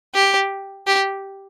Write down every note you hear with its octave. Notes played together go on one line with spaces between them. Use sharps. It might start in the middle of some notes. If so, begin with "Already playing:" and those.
G4
G4